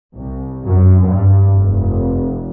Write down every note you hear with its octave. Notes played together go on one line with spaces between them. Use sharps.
C2
F#2
G2
F1